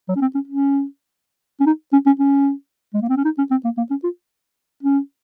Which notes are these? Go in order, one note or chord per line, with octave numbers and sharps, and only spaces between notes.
F#3
C#4
C4
C#4
C#4
C#4
D#4
C#4
C#4
C#4
G#3
A#3
C4
C#4
D#4
C#4
C4
A#3
A#3
C#4
F4
C#4